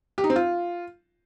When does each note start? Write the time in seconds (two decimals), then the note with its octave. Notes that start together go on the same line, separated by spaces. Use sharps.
0.18 G4
0.24 D#4
0.30 C4
0.36 F4